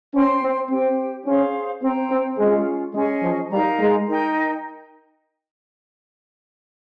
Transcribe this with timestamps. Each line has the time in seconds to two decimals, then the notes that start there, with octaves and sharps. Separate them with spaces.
0.14 C#4 C5 G5 C6
0.42 C4
0.70 C4 G4 C5 G5
1.26 C#4 G#4 C5 F5 C6
1.82 C4 C5 G5 A#5
2.10 C4
2.38 G#3 C#4 F4 G#4
2.94 G#3 C#4 G#4 D#5 G#5
3.23 F3
3.50 G3 D#4 A#4 F5 A#5
3.79 G#3
4.07 D#4 A#4 D#5 G5